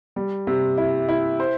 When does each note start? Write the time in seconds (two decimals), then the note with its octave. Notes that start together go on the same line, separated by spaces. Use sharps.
0.16 G3
0.47 C3
0.78 E4
1.09 E4
1.40 C5